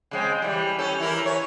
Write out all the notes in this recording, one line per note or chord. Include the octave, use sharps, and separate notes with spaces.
C#3 G#3 C4
E3 G3
C#4 A4
E3 E4 A#4
C#5